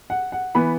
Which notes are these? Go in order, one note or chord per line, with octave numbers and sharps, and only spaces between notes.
F#5
F#5
E3 B3 B5